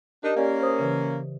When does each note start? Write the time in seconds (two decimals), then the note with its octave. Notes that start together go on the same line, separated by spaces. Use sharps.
0.23 D4 D#4 G4 A#4 D#5
0.37 A#3 C#4 G4 D5 G#5
0.61 C5 D#6
0.79 C#3 E3 B4